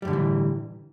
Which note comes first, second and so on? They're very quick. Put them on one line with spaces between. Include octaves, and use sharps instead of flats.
G3 F#2 D3 A2 E3